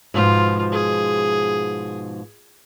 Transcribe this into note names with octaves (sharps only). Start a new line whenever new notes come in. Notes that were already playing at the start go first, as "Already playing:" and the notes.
G#2 B2 F3 F4
G#4